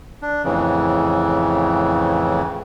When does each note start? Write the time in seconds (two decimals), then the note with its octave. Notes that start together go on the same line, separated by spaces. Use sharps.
0.22 D4
0.44 F2 A2 C#3 E3